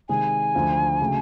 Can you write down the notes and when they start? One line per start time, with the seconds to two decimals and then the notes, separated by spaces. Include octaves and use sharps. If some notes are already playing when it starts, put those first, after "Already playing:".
0.09 C3 D#3 G#3 G#5
0.55 D2 D3 F3
1.02 C#3 F#3 A3